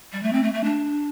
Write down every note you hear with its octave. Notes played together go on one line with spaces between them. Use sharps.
G3
A3
C4
A3
A3
D4